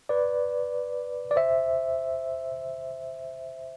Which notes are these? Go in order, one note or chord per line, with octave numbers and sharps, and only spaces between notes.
B4 D5
D5
C5 E5